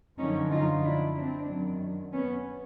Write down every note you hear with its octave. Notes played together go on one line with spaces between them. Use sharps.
F#2 D3 F3 C#4 D#4
D#4 F4
D4 E4
C4 D4
F#2 D#3 F#3
B3 C#4